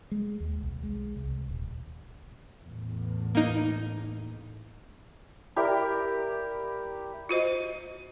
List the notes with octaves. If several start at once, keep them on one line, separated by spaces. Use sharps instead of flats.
G#3
D#2
B1
G#3
C2
D#1
E2 A2
A#3 D#4
E4 G4 A#4 D5
F4 F#4 C5 D#5